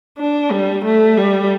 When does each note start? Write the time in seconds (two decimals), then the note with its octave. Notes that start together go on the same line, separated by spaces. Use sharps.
0.18 D4
0.51 G3
0.85 A3
1.18 G3